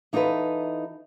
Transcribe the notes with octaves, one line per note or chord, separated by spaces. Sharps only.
E3 D#4 F4 A4 B4